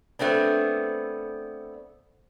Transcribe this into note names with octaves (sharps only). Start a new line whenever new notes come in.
A3 B3 C4 D4